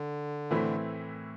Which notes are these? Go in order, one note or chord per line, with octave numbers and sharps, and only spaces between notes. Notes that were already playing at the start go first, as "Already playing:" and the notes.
Already playing: D3
A2 E3 A3 C4 E4